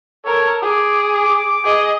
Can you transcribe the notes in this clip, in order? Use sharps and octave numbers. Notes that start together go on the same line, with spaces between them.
A4 A#4 C#5
G#4 D6
G#4 D#5